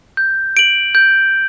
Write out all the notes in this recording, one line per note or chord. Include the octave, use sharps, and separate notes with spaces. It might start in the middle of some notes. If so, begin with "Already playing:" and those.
G6
D7 F#7
G6